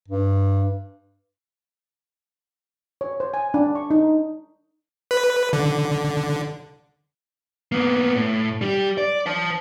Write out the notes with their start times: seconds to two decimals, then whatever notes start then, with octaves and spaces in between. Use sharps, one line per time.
0.08 G2
3.01 C#5
3.20 C5
3.34 G#5
3.54 D4
3.75 C#6
3.90 D#4
5.11 B4
5.53 D3
7.72 A#3 B3
8.15 A2
8.61 G3 G4
8.98 D5
9.26 C5 A5